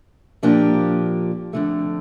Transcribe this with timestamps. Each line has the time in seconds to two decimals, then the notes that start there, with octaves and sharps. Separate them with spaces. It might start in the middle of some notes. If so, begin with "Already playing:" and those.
0.43 A#2 F3 A#3 D4 G4
1.53 F2 D3 A3